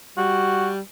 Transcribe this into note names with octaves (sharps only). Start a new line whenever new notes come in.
G3 F#4